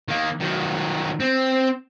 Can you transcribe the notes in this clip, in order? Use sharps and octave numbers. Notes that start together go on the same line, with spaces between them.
D#3 A#3
D#3 F#3
C4